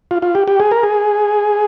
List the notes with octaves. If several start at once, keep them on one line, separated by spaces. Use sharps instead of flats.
F4
F4
G4
G4
G#4
A#4
G#4